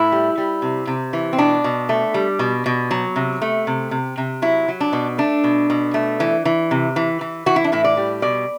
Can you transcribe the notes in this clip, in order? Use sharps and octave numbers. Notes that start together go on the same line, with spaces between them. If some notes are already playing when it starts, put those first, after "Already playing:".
Already playing: A2 E4
G3
G3
C3
C3
E3
C4
B2 D4
B2
A3
G3
B2
B2
F#3
C3
A3
C3
C3
C3
F#3 E4
F#3
D4
B2
A3 D4
B2
B2
A3
E3
E3
C3
E3
E3
E3 F#4
E4
D4
A2 E4
D5
G3
B2 D5